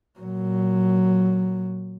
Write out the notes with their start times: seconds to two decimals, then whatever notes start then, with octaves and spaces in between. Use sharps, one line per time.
0.20 A#2 F#3